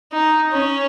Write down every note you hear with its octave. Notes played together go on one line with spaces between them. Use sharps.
D#4
C#4